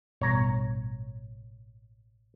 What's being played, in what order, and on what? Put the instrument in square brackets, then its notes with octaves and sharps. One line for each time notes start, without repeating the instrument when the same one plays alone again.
[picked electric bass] A1 G2 B2 [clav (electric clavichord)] C#5 A#5